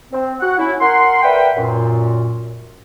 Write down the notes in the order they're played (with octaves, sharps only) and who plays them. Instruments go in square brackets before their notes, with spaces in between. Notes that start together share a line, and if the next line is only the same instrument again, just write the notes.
[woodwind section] C4
F#4 F#5
C#4 E4
A#4 F#5 C6
A#4 B4 D5 E5 F#5 G5
F#2 A#2